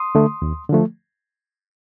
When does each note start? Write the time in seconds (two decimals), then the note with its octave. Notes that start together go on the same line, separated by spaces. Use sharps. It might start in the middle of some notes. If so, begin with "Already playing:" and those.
Already playing: C6 D#6
0.15 D3 A3
0.42 D#2
0.70 D3 F3 A3